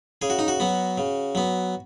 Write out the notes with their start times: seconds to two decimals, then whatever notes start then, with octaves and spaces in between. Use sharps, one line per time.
0.22 C#3 G#4
0.30 F#4
0.39 D#4
0.48 F#4
0.60 F#3 B3
0.98 C#3
1.35 F#3 B3